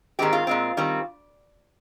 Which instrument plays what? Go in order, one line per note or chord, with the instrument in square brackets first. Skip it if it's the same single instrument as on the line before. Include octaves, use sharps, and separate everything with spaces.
[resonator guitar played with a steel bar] G#2 D#3 G#3 C4 G4
F4
A#2 G#3 C4
D#3 G3 C4